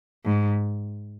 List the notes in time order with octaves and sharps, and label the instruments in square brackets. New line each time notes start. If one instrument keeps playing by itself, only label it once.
[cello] G#2